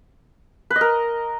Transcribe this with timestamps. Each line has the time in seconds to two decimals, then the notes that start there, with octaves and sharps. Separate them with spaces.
0.70 B4
0.76 D#5
0.81 A#4